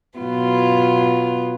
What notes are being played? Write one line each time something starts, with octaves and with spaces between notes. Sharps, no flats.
B2 F#3 B3 F4